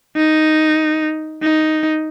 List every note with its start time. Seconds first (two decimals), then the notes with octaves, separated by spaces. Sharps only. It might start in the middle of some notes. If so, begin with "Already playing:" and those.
0.16 D#4
1.42 D#4